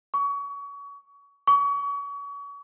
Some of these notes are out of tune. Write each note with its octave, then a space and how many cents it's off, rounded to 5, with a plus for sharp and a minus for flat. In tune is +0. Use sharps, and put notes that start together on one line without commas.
C#6 +30
C#6 +35